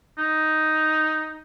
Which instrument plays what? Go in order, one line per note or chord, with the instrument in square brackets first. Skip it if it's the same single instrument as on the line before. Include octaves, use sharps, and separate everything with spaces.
[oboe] D#4